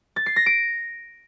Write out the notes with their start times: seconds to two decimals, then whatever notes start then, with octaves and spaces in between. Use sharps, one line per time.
0.16 A6
0.26 C7
0.36 A#6
0.46 D7